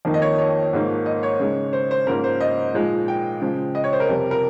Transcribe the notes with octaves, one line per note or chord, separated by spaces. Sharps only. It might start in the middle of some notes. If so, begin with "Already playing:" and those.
F2 D#3 A#3 D#4
D#5
C#5
C#5
G#2 F3 A#3 D#4
D#5
C#5
C#3 G#3 D#4
C5
C5
G#2 F3 A#3 C#4 A#4
C5
D#5
A#2 F3 G#3 D#4
G5
C#3 F3 G#3
D#5
C#5
C5
A#4
F2 C3 G3
A#4